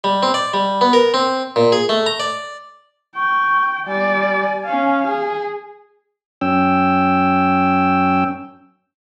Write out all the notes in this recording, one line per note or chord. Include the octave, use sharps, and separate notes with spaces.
G3
C4
D5
G3
B3
A#4
C4
A#2
G#4
A3
A#5
D5
G5 C#6
G3 D5 G#5
C#4 F5
G#4
F#2 C#4 G5 E6